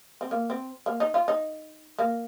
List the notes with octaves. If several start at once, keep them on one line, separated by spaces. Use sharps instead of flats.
C4
A#3
C4
A#3
D#4
F4
D#4
A#3